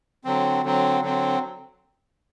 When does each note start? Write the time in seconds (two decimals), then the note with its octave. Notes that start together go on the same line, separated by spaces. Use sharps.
0.25 D3 F#3 C4
0.64 D3 F#3 C4
1.01 D3 F#3 C4